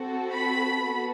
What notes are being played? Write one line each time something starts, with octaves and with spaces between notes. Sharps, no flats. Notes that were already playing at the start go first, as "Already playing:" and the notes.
Already playing: C4 F#4 A4
B5
B3 F#4 A4